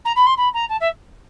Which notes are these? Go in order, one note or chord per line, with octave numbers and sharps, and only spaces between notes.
A#5
B5
C6
B5
A#5
A5
E5